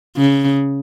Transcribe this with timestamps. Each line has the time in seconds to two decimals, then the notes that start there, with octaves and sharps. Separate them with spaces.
0.17 C#3